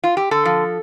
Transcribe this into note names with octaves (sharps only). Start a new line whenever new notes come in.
F4
G4
D3 A4
F3